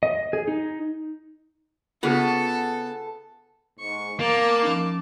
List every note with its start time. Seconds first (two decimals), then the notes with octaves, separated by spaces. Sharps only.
0.03 D#5
0.33 G#4
0.48 D#4
2.03 C#3 B3 F4 G#4 A4 B4 A5
3.79 G#2 C#6
4.19 A#3 A#4 A5 D6
4.63 F3 C#4 D#4